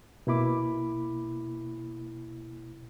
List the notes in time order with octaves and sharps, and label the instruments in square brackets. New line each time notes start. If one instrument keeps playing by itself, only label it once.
[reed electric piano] B2 A#3 E4 B5 D6